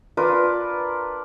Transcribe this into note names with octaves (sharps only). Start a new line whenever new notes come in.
D4 F4 A#4 B4